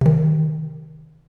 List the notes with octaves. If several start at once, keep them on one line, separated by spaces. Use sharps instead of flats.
C3 D#3